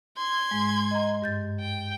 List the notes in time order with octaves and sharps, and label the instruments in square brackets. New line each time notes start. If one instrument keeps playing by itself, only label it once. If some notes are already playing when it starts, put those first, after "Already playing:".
[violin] C6 G#6
[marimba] G#2 G#3
D#5 A#5
G2 G6 A6
[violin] G5